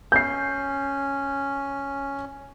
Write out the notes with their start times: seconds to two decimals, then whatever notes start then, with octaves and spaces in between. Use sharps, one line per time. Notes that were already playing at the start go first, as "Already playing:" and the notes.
0.12 C#4 G6 C7